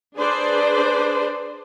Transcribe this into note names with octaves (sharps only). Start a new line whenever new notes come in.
D4 G#4 B4 C5 D5